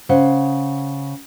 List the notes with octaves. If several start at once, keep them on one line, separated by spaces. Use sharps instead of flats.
C#3 C5 F#5